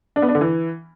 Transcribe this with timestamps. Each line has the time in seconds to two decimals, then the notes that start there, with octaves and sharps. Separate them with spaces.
0.16 D4
0.22 B3
0.29 D4
0.35 D3
0.41 E3